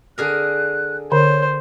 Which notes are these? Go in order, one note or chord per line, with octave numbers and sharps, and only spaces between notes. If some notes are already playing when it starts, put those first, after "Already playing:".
D3 G#4 A#4 F#6
D3 C5 C#5